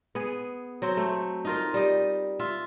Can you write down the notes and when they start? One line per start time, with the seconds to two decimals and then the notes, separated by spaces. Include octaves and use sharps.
0.15 B3 G#4
0.82 F#3 C4
0.97 A3
1.45 D#4 F4 A#4
1.74 G3 D#5
2.39 F4 E5